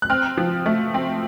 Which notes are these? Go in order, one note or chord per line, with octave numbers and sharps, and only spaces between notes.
F#6
C4 F6
F3
A3
C4